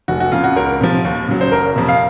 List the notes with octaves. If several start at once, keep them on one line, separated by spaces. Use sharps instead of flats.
F1 F#4
F#4
F2 C#3 F4
F#4
C#2 A#4
C3 F3
D#2
C#3 F#3
C5
F#1 A#4
F2 C3
F5